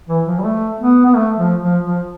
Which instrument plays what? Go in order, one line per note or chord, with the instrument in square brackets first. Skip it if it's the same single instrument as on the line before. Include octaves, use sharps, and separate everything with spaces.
[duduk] E3
F3
G3
A3
B3
B3
A3
F3
F3
F3